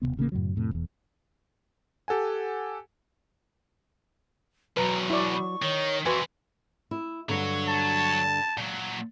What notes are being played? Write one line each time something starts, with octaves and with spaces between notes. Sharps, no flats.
D#1 A2 C3 B3
A1 C#3 G3 A#3
F#2 A2 C#3 F#3
F2 A2 C3
E1 E2
G4 A4 F#5 G#5
E2 B2 F#3 B4 A#5
E4 D5 C#6
D#3 C#5
F2 E3 F#4 B4 G#5 C6
E4
G2 D3 F#3 C#5
A5
A#2 F#3